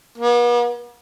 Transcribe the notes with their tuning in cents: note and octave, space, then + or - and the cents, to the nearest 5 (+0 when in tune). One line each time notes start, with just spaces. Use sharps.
B3 -45